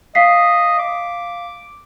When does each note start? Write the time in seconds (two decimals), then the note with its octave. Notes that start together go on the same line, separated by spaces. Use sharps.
0.15 D#5 F5 B6 C7
0.79 D6